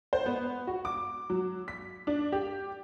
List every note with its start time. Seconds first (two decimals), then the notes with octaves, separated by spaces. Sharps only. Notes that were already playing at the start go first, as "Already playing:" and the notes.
0.13 C5
0.26 B3
0.67 F#4
0.85 D6
1.30 F#3
1.68 B6
2.07 D4
2.32 G4